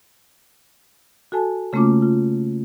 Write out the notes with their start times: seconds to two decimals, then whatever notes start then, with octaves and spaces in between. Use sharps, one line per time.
1.32 F#4 A4 G#5 A5
1.73 C#3 A3 A#3 C#4 F4 D6
2.02 F4